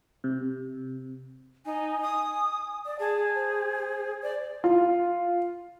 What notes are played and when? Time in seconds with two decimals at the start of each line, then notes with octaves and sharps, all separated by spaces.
0.24 C3
1.66 D#4 G#5
2.02 D#6
2.86 D5
3.00 G#4 A5
3.35 C5
4.22 C5 D5
4.64 F4